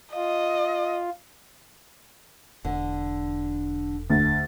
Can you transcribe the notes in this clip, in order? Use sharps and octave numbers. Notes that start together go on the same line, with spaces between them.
F4 D#5
E1 D3
D2 A6